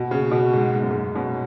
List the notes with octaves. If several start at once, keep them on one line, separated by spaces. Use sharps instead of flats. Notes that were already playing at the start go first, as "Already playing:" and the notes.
Already playing: B2 F#4
C#3
B2
G#2
G#2
F#2
G#2
B2 C#4